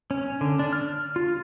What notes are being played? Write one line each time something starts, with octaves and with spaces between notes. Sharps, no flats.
C#4
D3
D4
F6
F4